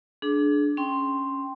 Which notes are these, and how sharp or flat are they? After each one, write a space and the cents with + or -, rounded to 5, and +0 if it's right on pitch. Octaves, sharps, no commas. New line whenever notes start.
D4 +0 G#4 +35
C#4 +0 G5 +0 C6 +0